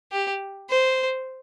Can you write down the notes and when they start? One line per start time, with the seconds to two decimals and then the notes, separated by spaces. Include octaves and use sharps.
0.12 G4
0.70 C5